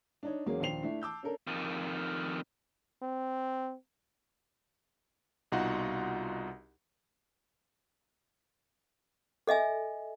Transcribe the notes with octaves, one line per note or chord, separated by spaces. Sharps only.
D4 D#4 C#5
E2 F#3 A#3 C#4 G#4
A#1 D#2 C5 G5 C7 F7
A3 D4 E4
A5 D6 E6 G6
C#4 D4 A4 A#4
F2 D#3
C4
C2 B2 D#4 F4 F#4 F#5
A4 D#5 E5 G#5